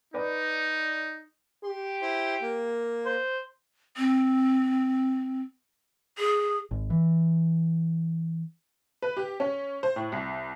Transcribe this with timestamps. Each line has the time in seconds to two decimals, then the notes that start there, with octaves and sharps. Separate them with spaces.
0.14 D#4 B4 D5
1.64 G4 C6
2.02 E4 C5 C6
2.42 A#3
3.06 C5
3.97 C4
6.18 G#4
6.71 G#1
6.90 E3
9.02 B4
9.17 G4
9.40 C#4
9.83 C5
9.96 A2
10.12 C2